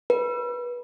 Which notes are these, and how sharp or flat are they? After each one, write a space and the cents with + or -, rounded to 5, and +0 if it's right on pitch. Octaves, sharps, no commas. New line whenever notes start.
B4 -25